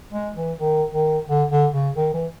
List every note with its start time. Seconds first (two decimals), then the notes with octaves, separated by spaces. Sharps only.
0.13 G#3
0.36 E3
0.59 D#3
0.94 D#3
1.28 D3
1.51 D3
1.74 C#3
1.97 D#3
2.14 E3